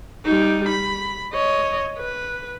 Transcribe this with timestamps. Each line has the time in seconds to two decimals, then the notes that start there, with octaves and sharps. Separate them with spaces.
0.26 G3 D#4
0.69 B5
1.34 C#5 D#5
1.98 B4